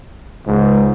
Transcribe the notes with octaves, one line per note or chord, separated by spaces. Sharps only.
C#2 G#2